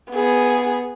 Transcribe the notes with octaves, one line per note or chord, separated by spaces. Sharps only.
B3 G#4